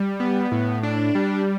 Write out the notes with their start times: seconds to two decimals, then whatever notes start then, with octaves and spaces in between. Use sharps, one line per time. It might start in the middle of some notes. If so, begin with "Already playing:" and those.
Already playing: G3
0.20 B3
0.52 A2
0.83 D4
1.15 G3